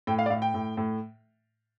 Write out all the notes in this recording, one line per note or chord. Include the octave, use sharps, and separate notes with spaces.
A2 G5
F5
D5
A2 F5
G5
A2
A2